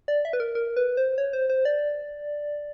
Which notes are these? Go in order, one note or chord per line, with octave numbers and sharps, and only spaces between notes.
D5
E5
B4
A#4
A#4
B4
C5
C#5
C5
C5
D5